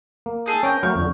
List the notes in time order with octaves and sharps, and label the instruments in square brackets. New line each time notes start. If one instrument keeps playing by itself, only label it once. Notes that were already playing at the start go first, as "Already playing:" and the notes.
[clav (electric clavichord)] A#3
[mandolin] D#4 G#4 A4
[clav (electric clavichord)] C#4 [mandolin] A#4 G5
[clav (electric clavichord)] F#3 A3 A#3 [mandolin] C#6 F6 G6
[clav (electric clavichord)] F2 D3